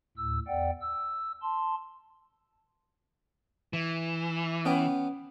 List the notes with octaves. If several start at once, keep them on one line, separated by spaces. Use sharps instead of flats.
D2 A2 E6
E2 D5 F#5 G5
E6
A5 C6
E3
B3 C#4 G5